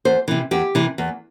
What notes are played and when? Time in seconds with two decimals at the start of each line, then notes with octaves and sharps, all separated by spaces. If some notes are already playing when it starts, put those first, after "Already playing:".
0.05 E2 C5
0.28 C3 E3
0.51 E2 G4
0.75 C3 E3
0.98 E2